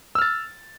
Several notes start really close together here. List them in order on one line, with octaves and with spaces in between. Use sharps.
E6 F6 A6